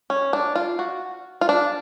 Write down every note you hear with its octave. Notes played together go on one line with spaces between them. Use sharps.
C#4
D4
F4
F#4
F4
D4